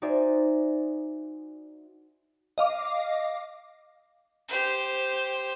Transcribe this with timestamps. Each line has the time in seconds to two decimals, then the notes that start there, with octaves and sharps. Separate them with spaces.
0.02 D#4 F#4 C5 D5 E5 G#5
2.58 D#5 F5 D6
4.48 G4 C5